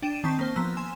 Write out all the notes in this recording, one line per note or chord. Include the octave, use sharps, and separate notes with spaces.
D4 G5 D#7 E7
D#3 C4 A5 C#6 G6 B6
A#3 C5
F3 B3 A#5 E6
G#5 C6 E7